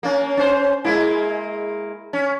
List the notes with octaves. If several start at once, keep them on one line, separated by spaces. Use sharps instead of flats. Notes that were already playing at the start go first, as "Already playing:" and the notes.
A#3 C#4
C#4 C5
G#3 A#3 E4
C#4